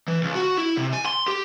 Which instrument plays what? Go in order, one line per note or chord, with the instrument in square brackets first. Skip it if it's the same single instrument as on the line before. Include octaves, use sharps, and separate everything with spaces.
[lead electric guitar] E3
C#2
F#4
E4
C3
G#5
C6
G4